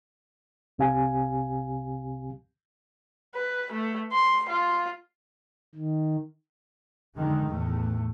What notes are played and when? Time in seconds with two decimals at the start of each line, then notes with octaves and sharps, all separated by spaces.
0.78 C2 C3 C4 G4 F5 G#5
3.35 B4
3.72 A3
4.13 C6
4.50 F4
5.75 D#3
7.16 F2 D3 D#3 G#3
7.45 E2 A2 A3